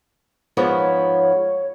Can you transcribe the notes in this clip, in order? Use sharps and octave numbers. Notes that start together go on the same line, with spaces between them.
G#2 F3 B3 C#5